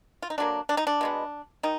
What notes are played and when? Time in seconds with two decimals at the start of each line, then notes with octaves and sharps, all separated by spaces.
0.22 F4
0.30 D#4
0.38 D3 F#3 A#3 D4
0.69 D4
0.77 D#4
0.87 D4
1.01 B2 G#3 B3
1.63 D#3 D#4